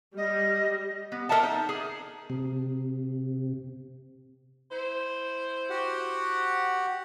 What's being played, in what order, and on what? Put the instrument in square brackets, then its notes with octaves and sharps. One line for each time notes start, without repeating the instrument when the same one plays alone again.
[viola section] G3 [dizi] D#5
[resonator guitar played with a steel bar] B3
A4 A#4 D#5 E5 F#5 A5
D#4
G#4
[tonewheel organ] C3
[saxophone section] E4 C5
[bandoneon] F#4 G4 F#5